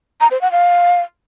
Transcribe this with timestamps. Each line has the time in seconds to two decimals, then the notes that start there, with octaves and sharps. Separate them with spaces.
0.21 A#5
0.31 C5
0.41 F#5
0.52 F5